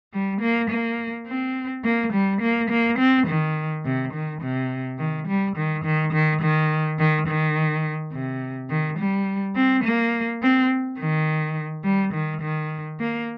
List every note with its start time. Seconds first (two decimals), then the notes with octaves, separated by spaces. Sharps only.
0.13 G3
0.41 A#3
0.70 A#3
1.27 C4
1.84 A#3
2.13 G3
2.41 A#3
2.70 A#3
2.99 C4
3.27 D#3
3.85 C3
4.13 D#3
4.42 C3
4.99 D#3
5.27 G3
5.56 D#3
5.84 D#3
6.13 D#3
6.42 D#3
6.99 D#3
7.27 D#3
8.12 C3
8.70 D#3
8.99 G3
9.56 C4
9.84 A#3
10.42 C4
10.99 D#3
11.84 G3
12.13 D#3
12.41 D#3
12.99 A#3